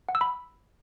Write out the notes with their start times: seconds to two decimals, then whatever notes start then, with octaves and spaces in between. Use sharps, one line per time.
0.09 F#5
0.15 E6
0.21 B5